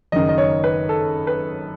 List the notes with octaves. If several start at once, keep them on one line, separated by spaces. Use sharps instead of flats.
F#1 F#2 D#3 D#5
D#5
C#5
B4
A4
B4